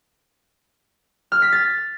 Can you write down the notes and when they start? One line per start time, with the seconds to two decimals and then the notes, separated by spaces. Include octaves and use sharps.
1.32 F6
1.42 B6
1.52 A6